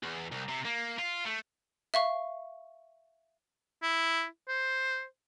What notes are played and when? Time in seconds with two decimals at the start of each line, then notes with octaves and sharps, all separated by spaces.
0.03 E2
0.32 C2
0.48 C3
0.65 A#3
0.99 F4
1.25 A3
1.94 E5 F5 C#6
3.82 E4
4.48 C5